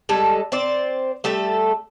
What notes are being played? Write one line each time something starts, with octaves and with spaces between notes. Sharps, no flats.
G3 G#3 A4
C4 C5 D5
G3 A3 G4 A4